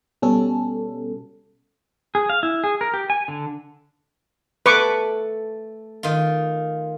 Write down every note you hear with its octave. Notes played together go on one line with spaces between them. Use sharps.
B2 G3 C#4 A4
G#4
F5
E4
G#4
A#4
G4
G#5
D3
A3 B4 C#6 D6
D#3 F4